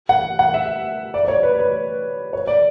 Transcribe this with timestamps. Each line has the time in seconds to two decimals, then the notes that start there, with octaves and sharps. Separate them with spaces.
0.09 F#5
0.39 F#5
0.54 E5
1.14 D5
1.25 D5
1.28 C#5
1.43 B4
1.59 B4
2.33 C#5
2.47 D5